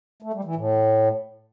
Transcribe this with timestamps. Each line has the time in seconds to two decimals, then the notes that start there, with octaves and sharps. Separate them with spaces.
0.22 A3
0.33 G3
0.44 E3
0.55 A2